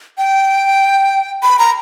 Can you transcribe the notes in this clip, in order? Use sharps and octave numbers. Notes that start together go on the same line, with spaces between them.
G5
B5
A#5